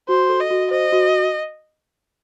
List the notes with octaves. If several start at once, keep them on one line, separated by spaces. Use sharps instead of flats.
F#4 C5
A4
D#5
F#4
C5 D#5
F#4